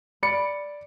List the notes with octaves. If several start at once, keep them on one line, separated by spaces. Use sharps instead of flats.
D5 B5 C#7